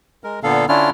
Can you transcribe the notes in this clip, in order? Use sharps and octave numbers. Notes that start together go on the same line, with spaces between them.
G#3 A#4
A#2 D3 B3 A4 F5
D3 C#4 D4 E4 F4 F6